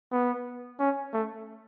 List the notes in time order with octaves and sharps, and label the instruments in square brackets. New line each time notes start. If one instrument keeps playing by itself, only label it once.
[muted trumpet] B3
C#4
A3